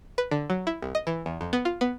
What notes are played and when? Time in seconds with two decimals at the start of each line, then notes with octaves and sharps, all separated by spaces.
0.18 B4
0.31 D3
0.50 F#3
0.67 E4
0.82 C2
0.95 D#5
1.07 E3
1.26 E2
1.41 F2
1.53 B3
1.65 F4
1.81 B3